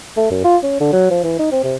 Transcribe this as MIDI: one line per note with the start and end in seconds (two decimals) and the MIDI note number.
0.17 0.27 57
0.31 0.44 42
0.44 0.57 65
0.63 0.76 61
0.80 0.90 50
0.92 1.10 54
1.10 1.21 53
1.24 1.36 52
1.39 1.51 63
1.52 1.62 60
1.64 1.75 48